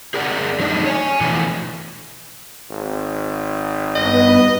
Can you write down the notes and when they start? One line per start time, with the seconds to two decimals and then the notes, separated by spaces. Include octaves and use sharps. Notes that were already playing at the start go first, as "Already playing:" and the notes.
0.14 G#4 A#4 D5 F#5
0.60 F#3 A3 D4 D#4
0.86 C#5 G#5
1.21 B2 E3 F3 A3 D4 G#5
2.70 G#1
3.95 G2 B3 B4 D#5